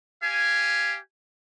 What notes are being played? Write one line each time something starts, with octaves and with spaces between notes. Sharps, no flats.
G4 F5 G#5